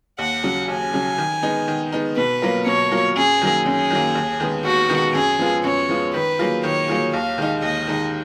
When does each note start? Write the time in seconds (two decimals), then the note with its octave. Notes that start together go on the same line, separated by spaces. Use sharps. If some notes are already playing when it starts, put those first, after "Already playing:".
0.18 D#2 F#5
0.43 C#3 F#3
0.68 D#2 G#5
0.93 C#3 F#3
1.18 D#3
1.43 G#3 B3 D#4
1.68 D#3
1.92 G#3 B3 D#4
2.16 B2 B4
2.42 F#3 A#3 F4 A#4
2.66 B2 C#5
2.91 F#3 A#3 F4 A#4
3.16 F#2 G#4
3.41 D#3 F#3 A#3
3.66 F#2 G#4
3.90 D#3 F#3 A#3
4.15 D#2
4.40 D#3 G#3 B3
4.65 D#2 F#4
4.89 D#3 G#3 B3
5.15 F#2 G#4
5.39 F3 G#3 B3 F4
5.64 F#2 C#5
5.89 F3 G#3 B3 F4
6.14 D#3 B4
6.39 F#3 A#3 F4 G#4
6.63 D#3 C#5
6.88 F#3 A#3 F4 G#4
7.13 D#2 F5
7.38 D#3 G#3 D#4
7.62 D#2 D#5
7.87 D#3 G#3 D#4